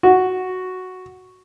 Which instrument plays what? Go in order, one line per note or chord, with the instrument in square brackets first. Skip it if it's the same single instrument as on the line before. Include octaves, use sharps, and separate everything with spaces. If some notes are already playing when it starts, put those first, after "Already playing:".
[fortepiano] F#4